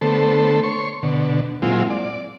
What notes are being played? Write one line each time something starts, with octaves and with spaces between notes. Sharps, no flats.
D3 A3 B3 A4 C5
C#5 C6 C#6
B2 D3
A#2 F#3 G#3 C4 E4 F4
D5